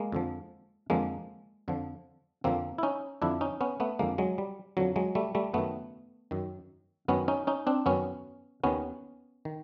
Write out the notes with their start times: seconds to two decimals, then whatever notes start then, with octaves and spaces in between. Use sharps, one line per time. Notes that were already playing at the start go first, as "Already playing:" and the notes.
Already playing: G#3 A#3
0.12 F2 D3 F3
0.90 F2 D3 F3 G#3 A#3
1.68 F2 D3 F3
2.44 F2 D3 F3 A#3 C4
2.78 E4
2.83 C#4 D#4
3.22 F2 D3 F3 D4 E4
3.41 C#4 D#4
3.61 B3 C#4
3.80 A3 B3
3.99 F2 D3 F3 G#3 A#3
4.18 F#3 G#3
4.38 G3
4.77 F2 D3 F3 F#3
4.96 F#3 G#3
5.15 G3 A3
5.35 G3 A3
5.54 F#2 D#3 A3 B3
6.31 F#2 D#3
7.08 F#2 D#3 B3 C#4
7.28 C#4 D#4
7.47 C#4 D#4
7.67 C4 D4
7.86 F#2 D#3 B3 C#4
8.64 D#2 D#3 B3 C#4
9.45 D#3